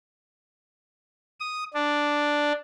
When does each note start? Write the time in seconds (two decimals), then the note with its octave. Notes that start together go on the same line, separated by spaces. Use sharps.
1.40 D#6
1.74 D4